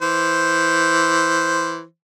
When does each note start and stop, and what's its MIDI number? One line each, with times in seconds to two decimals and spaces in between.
0.02 1.83 52
0.02 1.83 72